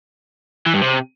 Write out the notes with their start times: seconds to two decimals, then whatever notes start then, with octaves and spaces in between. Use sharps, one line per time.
0.66 E3
0.74 G2
0.82 C3